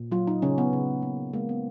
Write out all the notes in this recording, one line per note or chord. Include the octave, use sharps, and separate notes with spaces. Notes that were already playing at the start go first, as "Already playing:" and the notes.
Already playing: A#2
F#3 F4
D#4
C#3 C#4
B3
C#3
A#3
G#3 A#3
B3